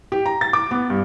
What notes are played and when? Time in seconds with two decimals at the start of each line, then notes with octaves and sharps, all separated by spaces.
0.12 G4
0.26 A#5
0.41 A6
0.53 D6
0.71 B3
0.90 G2